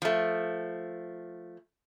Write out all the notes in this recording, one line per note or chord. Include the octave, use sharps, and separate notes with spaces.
F3 A3